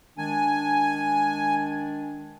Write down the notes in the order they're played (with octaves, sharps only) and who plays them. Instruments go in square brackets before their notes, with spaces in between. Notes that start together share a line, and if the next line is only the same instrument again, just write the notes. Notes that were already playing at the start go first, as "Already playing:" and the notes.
[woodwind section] D#3 G#3 D4 [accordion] G#5